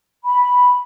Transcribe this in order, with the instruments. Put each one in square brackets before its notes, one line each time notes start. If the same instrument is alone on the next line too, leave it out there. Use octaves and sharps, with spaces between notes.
[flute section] B5